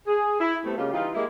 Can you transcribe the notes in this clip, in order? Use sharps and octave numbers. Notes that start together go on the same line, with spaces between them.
G#4
E4
G3 A3 B3 C4
C#3 G#3 A#3 C#4 F4 G4
E3 G3 D#4 F4
G3 G#3 A#3 E4